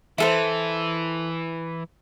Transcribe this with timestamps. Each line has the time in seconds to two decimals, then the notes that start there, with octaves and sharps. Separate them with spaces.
0.18 E3 E4 A4 C5